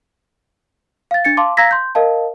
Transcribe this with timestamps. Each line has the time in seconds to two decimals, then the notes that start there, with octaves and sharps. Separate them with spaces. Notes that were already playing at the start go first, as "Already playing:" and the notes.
1.11 F5 A6
1.25 D4 A6 C#7
1.37 F5 A5 C6 D6
1.57 F5 A#5 E6 G#6 A#6 B6
1.71 C6 G6
1.95 A#4 D#5 F5 A5